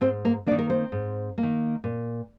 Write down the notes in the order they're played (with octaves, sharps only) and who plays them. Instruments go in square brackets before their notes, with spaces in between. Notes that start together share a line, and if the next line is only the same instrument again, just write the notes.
[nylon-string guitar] G#2 C4 C5
A#3 A#4
A#3 D4 D5
D#3
A#4
C4 C5
G#2
A#3
D#3
A#2